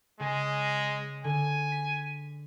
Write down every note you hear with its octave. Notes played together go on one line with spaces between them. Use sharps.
C#3 G#3 G#5
D3 G#5
B6